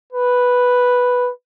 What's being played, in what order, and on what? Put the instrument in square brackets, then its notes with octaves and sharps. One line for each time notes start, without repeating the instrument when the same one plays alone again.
[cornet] B4